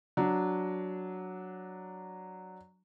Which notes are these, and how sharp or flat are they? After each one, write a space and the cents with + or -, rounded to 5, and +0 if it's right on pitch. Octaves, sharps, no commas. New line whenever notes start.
F#3 +0 D4 +0